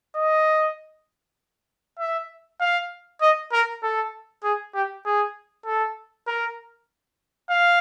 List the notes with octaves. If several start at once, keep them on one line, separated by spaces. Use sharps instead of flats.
D#5
E5
F5
D#5
A#4
A4
G#4
G4
G#4
A4
A#4
F5